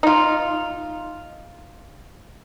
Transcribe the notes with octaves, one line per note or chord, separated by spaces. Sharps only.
D#4 F4